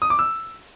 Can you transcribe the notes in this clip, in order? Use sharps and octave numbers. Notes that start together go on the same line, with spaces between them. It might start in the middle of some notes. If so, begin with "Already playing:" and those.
D#6
D6
E6